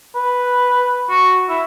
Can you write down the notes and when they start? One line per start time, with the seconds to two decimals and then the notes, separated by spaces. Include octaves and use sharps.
0.15 B4
1.09 F#4
1.49 E4